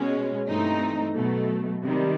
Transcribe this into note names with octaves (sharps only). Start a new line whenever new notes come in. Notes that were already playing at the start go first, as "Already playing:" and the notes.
Already playing: B2 G#3 C#4
G2 E3 A3 C4 D#4
B2 F#3 A3
C3 D#3 G3